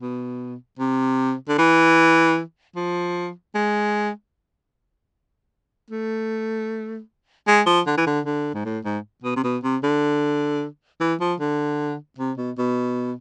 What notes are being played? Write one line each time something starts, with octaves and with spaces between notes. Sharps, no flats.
B2
C3
D3
E3
F3
G#3
A3
G#3
F3
D3
E3
D3
D3
G#2
A2
G#2
B2
C3
B2
C3
D3
E3
F3
D3
C3
B2
B2